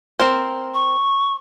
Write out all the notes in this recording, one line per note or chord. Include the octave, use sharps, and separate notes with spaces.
C4 A#4 C5
C#6